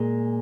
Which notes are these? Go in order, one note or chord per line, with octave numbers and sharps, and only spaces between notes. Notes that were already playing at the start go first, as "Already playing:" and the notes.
Already playing: A#2 G#3